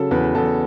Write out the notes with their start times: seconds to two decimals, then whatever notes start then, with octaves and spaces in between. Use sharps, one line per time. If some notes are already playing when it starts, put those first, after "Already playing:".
Already playing: C#3 F#3 A4
0.11 E2 B4
0.35 E2 A4